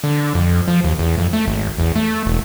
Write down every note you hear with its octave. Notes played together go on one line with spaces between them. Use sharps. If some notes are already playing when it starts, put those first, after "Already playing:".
D3
F2
F3
D#2
E2
F2
A3
G#1
E2
A3
E1